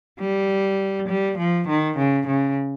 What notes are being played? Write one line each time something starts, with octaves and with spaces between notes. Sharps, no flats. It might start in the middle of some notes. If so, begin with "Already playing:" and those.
G3
G3
F3
D#3
C#3
C#3